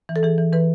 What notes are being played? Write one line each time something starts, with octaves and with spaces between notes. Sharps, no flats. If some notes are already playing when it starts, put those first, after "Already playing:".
E3
A4
E3 G#4
E3
E3 B4